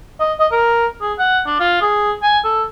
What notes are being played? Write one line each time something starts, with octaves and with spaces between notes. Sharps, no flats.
D#5
D#5
A#4
G#4
F#5
D4
F4
G#4
G#5
A4